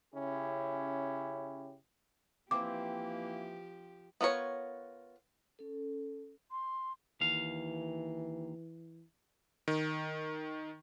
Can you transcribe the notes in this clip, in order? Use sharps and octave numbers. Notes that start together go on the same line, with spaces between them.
C#3 C#4 E4 G4
E3 F3 A#3 C4 G4 D6
B3 F4 A#4 C#5
C#4 A4
C6
D#2 E3 F5
D#3